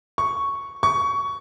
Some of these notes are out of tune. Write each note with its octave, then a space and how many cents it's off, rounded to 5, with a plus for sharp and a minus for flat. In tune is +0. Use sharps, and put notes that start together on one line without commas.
C#6 +0
C#6 +15